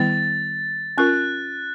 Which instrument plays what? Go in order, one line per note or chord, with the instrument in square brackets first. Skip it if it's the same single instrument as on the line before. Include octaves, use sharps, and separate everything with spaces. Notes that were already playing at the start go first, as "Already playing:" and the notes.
Already playing: [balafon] D#3 G3 B3 E4 [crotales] A6
[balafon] C#4 F4 A#4 [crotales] F#6